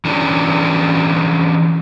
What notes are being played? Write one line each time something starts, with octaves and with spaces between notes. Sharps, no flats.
E3 C#4 D4 G4